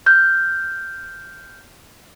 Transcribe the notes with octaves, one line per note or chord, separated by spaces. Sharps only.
F6 G6